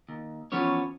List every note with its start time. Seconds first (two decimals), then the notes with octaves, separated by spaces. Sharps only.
0.09 D#2
0.52 E3 F3 B3 C#4 C#5